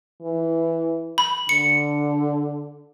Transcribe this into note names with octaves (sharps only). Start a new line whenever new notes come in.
E3
B5
D3 C#7